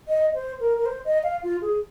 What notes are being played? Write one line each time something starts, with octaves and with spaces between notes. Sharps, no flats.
D#5
C5
A#4
A#4
C5
D#5
F5
F4
G#4